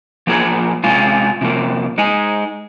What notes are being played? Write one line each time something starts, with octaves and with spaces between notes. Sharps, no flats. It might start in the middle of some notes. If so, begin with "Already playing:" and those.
F3 A#3 F4 G#4
C3 G#3 F4 G#4
C3 F3 A#3
G#3 D#4 G#4